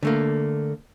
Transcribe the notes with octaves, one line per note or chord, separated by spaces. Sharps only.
D3 A3 A#3